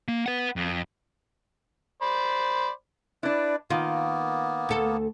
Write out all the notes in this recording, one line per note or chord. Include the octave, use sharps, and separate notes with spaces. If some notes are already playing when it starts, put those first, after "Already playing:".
A#3
B4 F#5
F2
C5 D5 B5
D4 E4 B4 D5
D#3 A#3 B3 F4
D2 A4